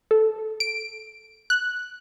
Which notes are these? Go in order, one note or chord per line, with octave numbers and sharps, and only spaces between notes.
A4
D7
F#6